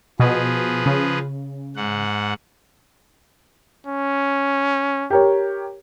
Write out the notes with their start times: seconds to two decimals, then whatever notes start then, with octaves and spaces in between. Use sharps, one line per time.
0.20 B2 F3 G#4 B4
0.86 C#3
1.76 G#2 F#5
3.87 C#4
5.10 G4 A#4 C#5